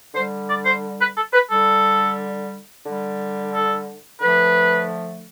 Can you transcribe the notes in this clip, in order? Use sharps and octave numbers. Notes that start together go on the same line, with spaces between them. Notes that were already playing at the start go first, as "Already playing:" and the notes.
D3 G3 C5
D5
C5
B4
A4
B4
D3 G3 A4
D3 G3
A4
D3 F3 A3 B4